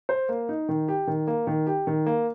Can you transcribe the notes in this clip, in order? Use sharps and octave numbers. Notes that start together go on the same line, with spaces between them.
C5
A#3
D#4
D#3
G4
D#3
A#3
D#3
G4
D#3
A#3